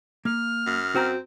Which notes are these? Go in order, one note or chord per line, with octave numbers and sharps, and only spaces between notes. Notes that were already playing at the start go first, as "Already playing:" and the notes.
A#3 F6
F#2
C4 F#4 A#5